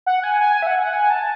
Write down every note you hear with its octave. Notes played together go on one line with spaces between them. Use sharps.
F#5
G#5
G#5
E5
F#5
F#5
G#5
A5